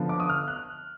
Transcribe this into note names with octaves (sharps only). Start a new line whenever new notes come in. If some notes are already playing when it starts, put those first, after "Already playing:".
Already playing: D3 F3 B3
D6
D#6
F6
F#6